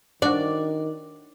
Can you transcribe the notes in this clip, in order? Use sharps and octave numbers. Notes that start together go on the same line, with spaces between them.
D#3 D4 F#4 D5